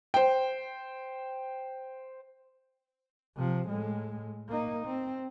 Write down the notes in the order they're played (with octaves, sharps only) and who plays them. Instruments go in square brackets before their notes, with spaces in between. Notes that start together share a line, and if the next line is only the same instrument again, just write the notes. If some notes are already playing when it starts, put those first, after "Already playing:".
[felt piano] C5 G5
[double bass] C3 F3
A2 G#3
A#3 D#4
C4